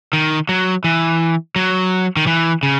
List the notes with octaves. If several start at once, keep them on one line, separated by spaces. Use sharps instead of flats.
D#3
F#3
E3
F#3
D#3
E3
C#3